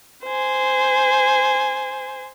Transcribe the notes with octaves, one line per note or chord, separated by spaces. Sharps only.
C5 G#5